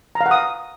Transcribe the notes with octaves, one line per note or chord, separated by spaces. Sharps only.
A#5
F5
F#5
D#6